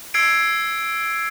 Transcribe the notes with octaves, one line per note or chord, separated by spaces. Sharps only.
E6 G#6 C7 D7